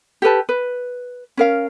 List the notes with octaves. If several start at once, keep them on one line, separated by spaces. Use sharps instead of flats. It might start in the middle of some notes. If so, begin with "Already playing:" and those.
G4 A4 B4 A5
B4
C#4 A#4 F5